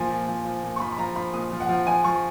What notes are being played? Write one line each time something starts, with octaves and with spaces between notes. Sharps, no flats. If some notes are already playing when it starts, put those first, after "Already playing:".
Already playing: A#2 F3 G#5
A#2
F3
F3
A#2
C#6
F3 B5
B5
F3 A#5
F3 B5
A#2 D#6
F3
F#5
F3
F3 G#5
F3 C#6